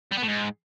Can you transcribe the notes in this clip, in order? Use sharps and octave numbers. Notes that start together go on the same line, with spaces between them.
G3
B3
A2
G#2